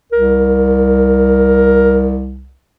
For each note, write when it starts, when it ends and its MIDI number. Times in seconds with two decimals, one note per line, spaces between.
0.12 2.54 36
0.12 2.18 70